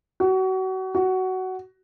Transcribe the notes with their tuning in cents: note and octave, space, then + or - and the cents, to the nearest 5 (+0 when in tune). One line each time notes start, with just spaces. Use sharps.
F#4 +30
F#4 +15